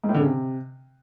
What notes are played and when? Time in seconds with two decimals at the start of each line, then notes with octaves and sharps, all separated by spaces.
0.04 G#2
0.09 A2
0.14 D3
0.20 C#3
0.25 C3